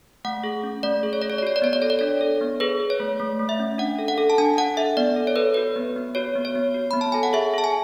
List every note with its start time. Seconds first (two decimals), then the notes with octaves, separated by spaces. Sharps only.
0.25 A3 F#5
0.44 G#4
0.64 C#4
0.83 A3 D5
1.03 G#4
1.13 C#5
1.22 G#4 D5
1.30 C#5
1.38 D5
1.42 F#4 C#5
1.56 D5
1.62 B3 C#5
1.73 D5
1.82 A4 C#5
1.90 D5
1.99 D4 C#5
2.21 A4
2.41 B3
2.60 G#4 B4
2.80 G#4
2.90 C#5
3.00 A3
3.20 A3
3.39 A3
3.49 E5
3.59 C#4
3.78 D4 F#5
3.99 A4
4.08 F#5
4.18 A4
4.30 A5
4.38 D4 G#5
4.58 D4 F#5
4.77 A4 E5
4.97 B3 D5
5.16 A4
5.27 C#5
5.36 A4 B4
5.54 F#4 B4
5.76 B3
5.96 B3
6.15 F#4 C#5
6.36 B3
6.45 C#5
6.55 B3
6.74 F#4
6.91 B3 B5
7.01 A5
7.12 A4 G#5
7.23 F#5
7.33 G#4 E5
7.54 G#4 A5
7.64 G#5